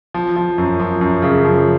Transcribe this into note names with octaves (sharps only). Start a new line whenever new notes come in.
F3
F3
F#2
F3
F#2
C#3
F3